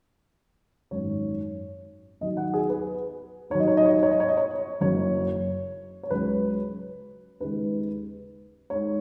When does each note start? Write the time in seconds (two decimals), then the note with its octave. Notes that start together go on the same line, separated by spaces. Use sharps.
0.91 G#1 F#2 D#3 C#5
2.21 D#2 D#3 F#3 D#5
2.37 F#5
2.53 G#4
2.69 B4
3.50 D#2 D#3 F#3 C#5
3.60 D#5
3.68 C#5
3.77 D#5
3.85 C#5
3.94 D#5
4.03 C#5
4.11 D#5
4.20 C#5
4.28 D#5
4.37 C#5
4.81 F#1 F#2 F#3 C#5
6.03 C#5
6.10 C#2 C#3 F#3 B4
7.40 D#2 C#3 G#3 B4
8.70 D#2 D#3 G#3 C#5